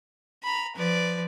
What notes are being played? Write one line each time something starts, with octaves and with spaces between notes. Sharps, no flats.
A#5 B5
F3 B4 D5